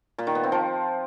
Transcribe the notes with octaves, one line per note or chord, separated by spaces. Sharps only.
A#2
D#3
B3
C4
F3